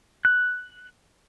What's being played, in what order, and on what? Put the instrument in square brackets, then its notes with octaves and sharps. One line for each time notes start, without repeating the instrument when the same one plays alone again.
[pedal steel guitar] F#6